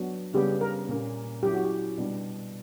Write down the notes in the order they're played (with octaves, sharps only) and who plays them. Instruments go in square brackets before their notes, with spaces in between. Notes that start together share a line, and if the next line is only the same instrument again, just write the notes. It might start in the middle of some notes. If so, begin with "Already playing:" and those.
Already playing: [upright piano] F#3 B3 D4 [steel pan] F#4
[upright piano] C#3 G3 B3 D4 [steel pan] G4
[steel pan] A#4
[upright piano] A#2 A#3 C#4
[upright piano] F#3 C#4 E4 [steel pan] G4
[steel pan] F#4
G4
[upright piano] B2 G3 B3 D4